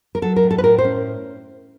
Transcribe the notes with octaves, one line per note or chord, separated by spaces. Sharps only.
A#4
F#3 A4
A#4
A2
A4
B4
A2 A#4
C5
C#4